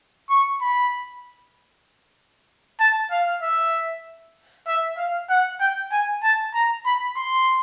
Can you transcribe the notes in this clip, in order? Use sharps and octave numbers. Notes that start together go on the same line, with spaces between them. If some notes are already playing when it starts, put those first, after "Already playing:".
C#6
B5
A5
F5
E5
E5
F5
F#5
G5
G#5
A5
A#5
B5
C6